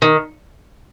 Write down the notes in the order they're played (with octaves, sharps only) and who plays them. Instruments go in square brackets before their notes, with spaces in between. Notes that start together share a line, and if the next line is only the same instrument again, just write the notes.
[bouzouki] D#3